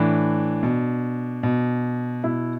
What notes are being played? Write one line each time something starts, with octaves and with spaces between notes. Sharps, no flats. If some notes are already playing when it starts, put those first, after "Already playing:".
Already playing: A2 E3 D4
B2
B2
B2 E4